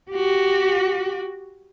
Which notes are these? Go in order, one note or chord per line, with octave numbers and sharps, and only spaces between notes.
F#4 G4